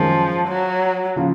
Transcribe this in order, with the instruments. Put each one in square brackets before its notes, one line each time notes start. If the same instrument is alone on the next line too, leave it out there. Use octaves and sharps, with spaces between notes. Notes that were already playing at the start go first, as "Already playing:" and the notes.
Already playing: [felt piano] F#2 D#3 G#3 [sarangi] F3
[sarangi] F#3
[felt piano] C#3 F3